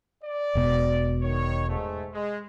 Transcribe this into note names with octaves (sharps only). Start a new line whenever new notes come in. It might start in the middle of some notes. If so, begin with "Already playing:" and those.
D5
E1 B2
D#3 C#5
G#2 A3
G#3